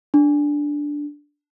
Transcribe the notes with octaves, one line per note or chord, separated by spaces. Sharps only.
D4